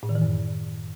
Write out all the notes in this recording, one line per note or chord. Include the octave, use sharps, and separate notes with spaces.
A2
D#3
E3
F#2